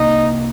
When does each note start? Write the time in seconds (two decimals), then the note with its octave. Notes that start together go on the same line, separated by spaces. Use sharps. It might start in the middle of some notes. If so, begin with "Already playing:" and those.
Already playing: C2 C3 A#3 D#4